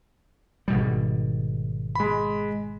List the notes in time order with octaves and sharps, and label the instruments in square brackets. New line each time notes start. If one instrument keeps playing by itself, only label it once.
[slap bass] G#1 B2 G3
[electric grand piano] G#3 B5